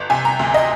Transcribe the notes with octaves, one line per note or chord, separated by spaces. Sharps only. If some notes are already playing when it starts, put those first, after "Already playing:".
Already playing: G1
C3 G#5
A#5
D2
D#5